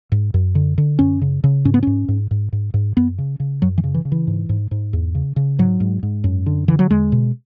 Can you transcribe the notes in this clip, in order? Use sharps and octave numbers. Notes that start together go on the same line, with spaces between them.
G#2
F#2
D3
D3
F#2 C#4
C#3
C#3
G#2 C#4
B3
G#2 C#4
G#2
G#2
G#2
G#2
F#2 B3
C#3
C#3
F#2 F#3
E3
C#3
E3
C#3
E3
G#2
G#2
G#2
E2
C#3
C#3
G#2 F#3
G#2
G#2
F#2
D3
D3 E3
F#3
E2 G#3
B2